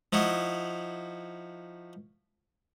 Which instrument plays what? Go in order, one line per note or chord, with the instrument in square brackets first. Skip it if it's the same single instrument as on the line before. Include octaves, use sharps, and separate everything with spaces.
[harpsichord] F3 D#4 E4 F#4